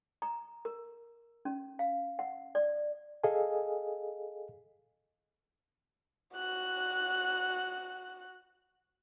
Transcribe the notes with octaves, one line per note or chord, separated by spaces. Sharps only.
A#5
A#4
C#4
F5
F#5
D5
G#4 A4 D#5 F5 G#5
F#4 F#6